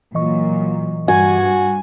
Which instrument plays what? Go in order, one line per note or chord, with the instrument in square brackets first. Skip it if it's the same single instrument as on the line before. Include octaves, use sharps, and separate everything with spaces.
[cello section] A#2 F#3 [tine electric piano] E3 D#5 C#6
[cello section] G2 [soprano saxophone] F#4 [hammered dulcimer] G#5